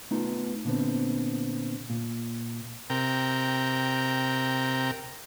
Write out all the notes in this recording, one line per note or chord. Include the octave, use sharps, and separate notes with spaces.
A3 B3 D#4 F4
A#2 D3 B3 C4
A#2
C3 A#4 G5